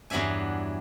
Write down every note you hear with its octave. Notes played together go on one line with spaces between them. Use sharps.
E2 G2 F#3 D4 E5 G#5